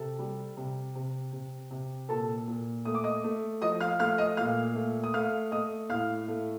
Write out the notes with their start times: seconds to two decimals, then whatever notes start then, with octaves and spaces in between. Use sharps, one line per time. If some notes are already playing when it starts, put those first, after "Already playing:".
Already playing: C3 A4 A5
0.19 G3
0.57 C3
0.95 C3
1.33 C3
1.71 C3
2.09 A#2 A4 A5
2.48 A#2
2.85 A3 D#6
2.95 D6
3.04 D#5 D#6
3.24 A3
3.62 F3 D#5 D#6
3.81 F5 F6
3.99 A3 F5 F6
4.18 D#5 D#6
4.37 A#2 F5 F6
4.75 A3
5.04 D#6
5.14 A3 F5 F6
5.51 A3 D#5 D#6
5.89 A2 F5 F6
6.28 A3